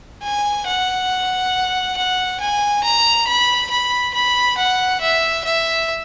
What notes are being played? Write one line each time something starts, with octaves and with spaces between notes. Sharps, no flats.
G#5
F#5
F#5
G#5
A#5
B5
B5
B5
F#5
E5
E5